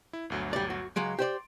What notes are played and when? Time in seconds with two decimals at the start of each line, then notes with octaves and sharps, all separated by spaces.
0.13 E4
0.30 G1 D2 F#3
0.53 G3 D5
0.70 F#4
0.96 C#2 F#3 G#3 C6 D7
1.19 G4 C5 D5